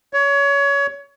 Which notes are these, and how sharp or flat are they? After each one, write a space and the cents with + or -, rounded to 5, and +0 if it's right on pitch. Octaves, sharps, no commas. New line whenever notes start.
C#5 +25